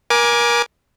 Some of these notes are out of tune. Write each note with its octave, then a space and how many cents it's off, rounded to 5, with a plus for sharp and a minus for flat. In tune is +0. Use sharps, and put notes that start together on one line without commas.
A#4 +30 G#5 +0 D6 +0